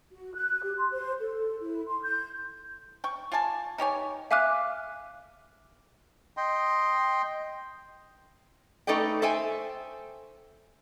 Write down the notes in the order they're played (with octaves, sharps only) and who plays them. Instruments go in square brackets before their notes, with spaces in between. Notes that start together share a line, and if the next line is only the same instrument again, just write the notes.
[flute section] F#4
F#6
G4
C6
C5
A4
E4
C6
G6
[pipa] G5 C#6
F4 D5 G#5 A5
D#4 G4 C#5 G#5
[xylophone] E5 F5 G#5 D6 F6 F#6
[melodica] D#5 G5 C6
[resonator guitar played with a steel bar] A3 D#4 A4 B4 D5 G5
A4 C5 E5 G5 G#5